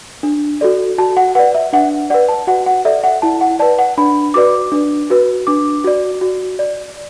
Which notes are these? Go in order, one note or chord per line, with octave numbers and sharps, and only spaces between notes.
D4
F#4 A4 D5
F#4 A5
F#5
B4 D5 F#5
E5
D4 F#5
B4 D5 F#5
A5
F#4 F#5
F#5
A4 D5 E5
F#5
E4 A5
F#5
B4 D5 A5
F#5
D4 B5
F#4 B4 D5 D6
D4
F#4 B4
D4 D6
F#4 D5
F#4
D5